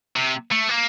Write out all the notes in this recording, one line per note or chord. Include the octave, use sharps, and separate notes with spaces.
C3
A3
A#3